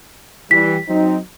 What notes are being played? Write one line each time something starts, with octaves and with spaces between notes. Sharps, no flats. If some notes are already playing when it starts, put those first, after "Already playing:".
E3 G3 B6
F#3 C4 D#4